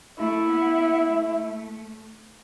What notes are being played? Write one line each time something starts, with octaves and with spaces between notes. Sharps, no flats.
A3 E4
B3
B3
A3